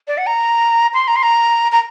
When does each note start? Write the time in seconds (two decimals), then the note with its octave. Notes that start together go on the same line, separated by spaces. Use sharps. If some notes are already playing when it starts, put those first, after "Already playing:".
0.08 D5
0.18 F#5
0.27 A#5
0.94 C6
1.08 A#5
1.16 C6
1.23 A#5
1.72 A#5